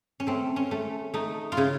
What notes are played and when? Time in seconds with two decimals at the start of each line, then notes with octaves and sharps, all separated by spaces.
0.20 C#4
0.27 A3 C4
0.56 C#4
0.71 A3
1.14 A3 D#4
1.52 F4
1.57 C#3 E4